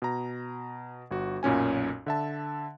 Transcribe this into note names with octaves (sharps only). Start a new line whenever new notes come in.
B2 A#5
G1 F#4
B1 F#2 A#2 C#4 G#5
D3 E5 A5